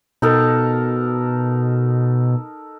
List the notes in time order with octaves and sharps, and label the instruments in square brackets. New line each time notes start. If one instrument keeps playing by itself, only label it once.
[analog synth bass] B2 [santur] D#4 A4 A#4